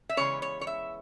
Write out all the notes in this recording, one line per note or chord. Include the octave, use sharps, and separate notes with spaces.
E5
C#3 E3 G#3 B3 C#5
C#5
C#5
E5